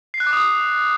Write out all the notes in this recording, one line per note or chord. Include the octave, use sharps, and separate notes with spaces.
C7
F#6
D6
D#6